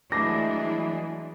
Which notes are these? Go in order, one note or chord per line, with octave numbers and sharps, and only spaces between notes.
E3 F#3 G#3 A3 D4 D6 A#6